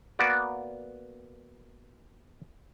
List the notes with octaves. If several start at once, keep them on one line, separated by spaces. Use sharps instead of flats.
A#3 B3 F#4 D5